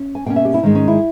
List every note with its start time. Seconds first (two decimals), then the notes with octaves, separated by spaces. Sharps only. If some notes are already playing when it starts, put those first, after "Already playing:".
Already playing: C#4
0.15 G#5
0.26 B2 A#3 C#4 G5
0.36 E5
0.45 G4
0.54 E4
0.63 G#2 D#3 G#3 C#4
0.75 C#4
0.88 E4